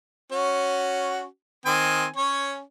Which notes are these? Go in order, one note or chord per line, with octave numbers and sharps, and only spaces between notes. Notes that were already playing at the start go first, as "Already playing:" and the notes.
C#4 F#4
D#3 C4 G#5
C#4 C#5